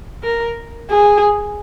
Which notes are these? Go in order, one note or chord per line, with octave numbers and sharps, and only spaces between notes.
A#4
G#4